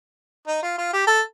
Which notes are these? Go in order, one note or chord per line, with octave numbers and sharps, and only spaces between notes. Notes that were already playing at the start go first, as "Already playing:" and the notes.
D#4
F4
F4
G4
A4